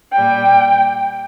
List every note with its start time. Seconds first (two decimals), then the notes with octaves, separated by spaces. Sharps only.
0.14 A#2 G3 G5